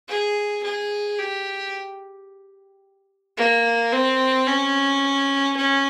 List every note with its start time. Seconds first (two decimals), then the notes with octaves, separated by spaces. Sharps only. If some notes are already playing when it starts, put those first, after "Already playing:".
0.08 G#4
0.63 G#4
1.19 G4
3.37 A#3
3.92 C4
4.47 C#4
5.56 C#4